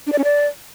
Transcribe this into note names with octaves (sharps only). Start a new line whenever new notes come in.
D4
D5
C#4
D5